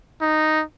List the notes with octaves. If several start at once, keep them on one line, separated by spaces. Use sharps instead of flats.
D#4